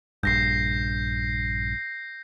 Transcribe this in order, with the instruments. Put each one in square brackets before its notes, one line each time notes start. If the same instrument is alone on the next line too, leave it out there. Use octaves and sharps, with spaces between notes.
[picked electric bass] A#1 G2 [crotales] G6 A#6 C7